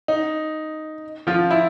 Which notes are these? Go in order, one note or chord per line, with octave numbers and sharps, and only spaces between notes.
D#4
F3 F4
E4